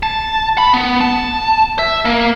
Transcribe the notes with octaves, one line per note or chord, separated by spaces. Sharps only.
A5
B5
B3
A5
E5
A#3